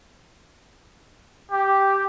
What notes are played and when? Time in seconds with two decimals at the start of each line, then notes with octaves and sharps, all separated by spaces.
1.51 G4